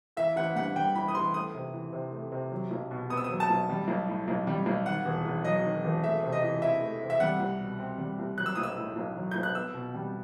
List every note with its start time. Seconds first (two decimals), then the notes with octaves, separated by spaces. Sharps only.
0.17 E3 E5
0.36 A1 F#5
0.56 G2 F#5
0.76 G3 G5
0.95 E3 B5
1.08 D#6
1.15 A1 C6
1.34 A3 D#6
1.55 C3
1.73 E3
1.93 C3
2.12 A3
2.32 C3
2.52 F#3
2.71 B1
2.91 B2
3.10 B3 D#6
3.17 E6
3.24 D#6
3.30 F#3
3.40 A5
3.50 B1
3.69 G3
3.88 B1
4.08 A2
4.28 B1
4.47 G3
4.66 B1
4.86 D#3 F#5
5.05 E1
5.25 E2
5.45 F#3 D#5
5.64 D#3
5.84 E1
6.03 A3 E5
6.24 C3
6.32 D#5
6.43 E3
6.62 E4 E5
6.82 A3
7.00 C3
7.10 E5
7.20 G3 F#5
7.40 C2
7.60 B2
7.79 C4
7.98 G3
8.19 C2
8.38 F#3 F#6
8.46 E6
8.55 B1 D#6
8.63 E6
8.78 A2
8.96 B1
9.16 F#3
9.31 B1 G6
9.43 F#6
9.54 B3 E6
9.74 B2
9.94 G3